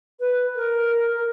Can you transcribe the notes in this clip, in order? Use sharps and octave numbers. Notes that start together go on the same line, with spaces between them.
B4
A#4
A#4